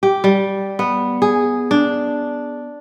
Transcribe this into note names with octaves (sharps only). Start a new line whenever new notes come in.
G4
G3
B3
G#4
D4